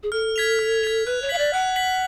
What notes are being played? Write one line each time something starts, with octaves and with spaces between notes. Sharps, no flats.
G#4
A4 F6
G#6 B6 F7
F6
G#6 B6 F7
B4 F#6
C#5
F5 B6 F#7
D5
F#5 F#6
B6 F#7